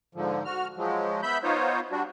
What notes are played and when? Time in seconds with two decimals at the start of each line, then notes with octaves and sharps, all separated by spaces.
0.15 G#2 D3 F3
0.45 F#4 F6
0.77 F3 F#3 G#3
1.23 B3 E5 B5 G6
1.43 B3 D#4 F4 C5 C#5
1.91 G3 D4 F#4